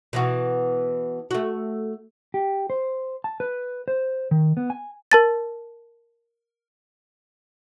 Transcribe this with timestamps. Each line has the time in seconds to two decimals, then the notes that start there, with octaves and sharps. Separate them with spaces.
0.13 B2 E3 F#4
1.31 A3 F#4
2.34 G4
2.70 C5
3.24 A5
3.40 B4
3.88 C5
4.31 D#3
4.57 B3
4.70 G#5
5.12 A#4 A5 A6